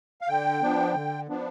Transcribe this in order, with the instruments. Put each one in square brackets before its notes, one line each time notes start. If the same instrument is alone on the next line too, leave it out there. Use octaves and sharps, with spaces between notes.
[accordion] F5
D3 G5
F3 B3 D4
D3
F3 B3 D4